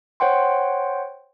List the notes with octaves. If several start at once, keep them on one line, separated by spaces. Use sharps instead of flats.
C5 C#5 F#5 G5 C6